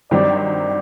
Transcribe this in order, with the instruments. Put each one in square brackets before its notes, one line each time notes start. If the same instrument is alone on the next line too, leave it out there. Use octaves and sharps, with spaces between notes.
[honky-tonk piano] G2 D#3 F#3 C4 G4 [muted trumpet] D5
[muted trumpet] D5